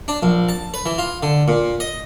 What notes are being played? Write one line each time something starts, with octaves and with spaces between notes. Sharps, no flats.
D4
A#1
A5
B4
E3
F4
D3
A#2
D#5